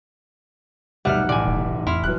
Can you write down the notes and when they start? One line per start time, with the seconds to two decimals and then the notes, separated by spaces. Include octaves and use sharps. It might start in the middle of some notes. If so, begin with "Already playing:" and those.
1.05 F1 B1 G3 E5 F#5 F6 F#6
1.29 A1 D5 G#5
1.47 E1
1.87 F2 E4 C6 F6
2.04 F1 E3 F#3 F#6